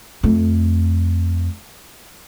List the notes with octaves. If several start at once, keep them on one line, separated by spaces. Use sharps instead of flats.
F2 A3